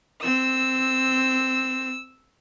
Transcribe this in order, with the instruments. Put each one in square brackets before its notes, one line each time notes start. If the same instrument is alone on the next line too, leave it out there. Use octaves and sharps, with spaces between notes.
[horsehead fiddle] C4 [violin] E6